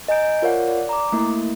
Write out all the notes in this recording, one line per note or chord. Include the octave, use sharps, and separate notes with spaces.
D#5 G#5 A#5 G6 D7
F4 A#4 C#5 D5 F5 F#5
D5
A#5 D6
A3 A#3 E4